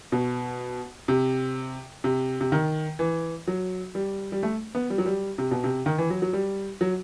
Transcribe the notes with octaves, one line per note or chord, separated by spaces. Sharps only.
B2
C3
C3
C3
D#3
E3
F#3
G3
G3
A3
B3
G3
F#3
G3
C3
B2
C3
D#3
E3
F#3
F#3
G3
F#3